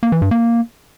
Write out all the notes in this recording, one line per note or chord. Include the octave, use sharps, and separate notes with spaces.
A#3
E3
G2
A#3